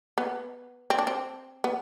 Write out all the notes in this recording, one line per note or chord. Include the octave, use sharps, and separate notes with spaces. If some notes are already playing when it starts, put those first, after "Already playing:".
B3
C4
D4
C4
B3